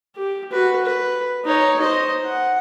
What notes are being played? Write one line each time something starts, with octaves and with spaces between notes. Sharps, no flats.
G4
F#4 B4
B4
D#4 C#5
C5 D#5
F#5